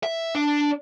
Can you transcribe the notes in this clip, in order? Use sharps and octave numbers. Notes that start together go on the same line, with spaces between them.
E5
D4